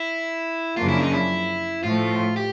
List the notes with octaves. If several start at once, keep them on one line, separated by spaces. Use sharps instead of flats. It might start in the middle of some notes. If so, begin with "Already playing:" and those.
Already playing: E4
F#2 C#3 F3 A#3 D4 F4
E4
D#4
E4
A2 F3 A3 F4
G4